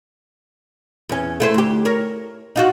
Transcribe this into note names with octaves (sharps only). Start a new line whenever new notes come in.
E2 C#4
A3 E4 C5
D2 G4
A#4 C#5
D#4 F4 F#4